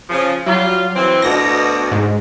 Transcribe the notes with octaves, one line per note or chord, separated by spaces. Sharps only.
C#3 F3
F#3 G3 F4
E3 C4
D2 B2 A#6
G#2